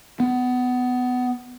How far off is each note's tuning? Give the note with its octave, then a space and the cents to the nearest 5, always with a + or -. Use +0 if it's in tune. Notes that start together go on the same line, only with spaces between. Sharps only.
B3 +20